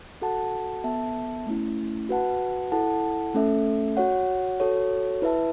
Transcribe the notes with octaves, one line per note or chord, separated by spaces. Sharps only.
F#4 A4 F#5 A5
B3 A4 E5 A5
A3 C#4 E4
F#4 B4 F#5 A5
E4 A4 F#5 A5
A3 C#4 A4 E5
F#4 C#5 F#5
F#4 A4 C#5
E4 B4 E5 A5